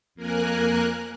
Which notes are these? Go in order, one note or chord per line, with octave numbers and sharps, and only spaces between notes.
F2 A#3 A#4 G#5 F#6